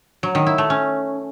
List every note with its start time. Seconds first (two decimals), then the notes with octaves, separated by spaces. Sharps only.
0.23 F#3
0.35 D#3
0.46 E4
0.58 A3
0.70 C#4